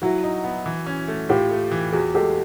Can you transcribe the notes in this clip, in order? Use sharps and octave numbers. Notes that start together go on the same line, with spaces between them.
F#3 E4 F#4
D#4
B3
E3
C#4
A3
A2 F4 G4
A3
E3
E2 F#4 G#4
G#3 G4 A4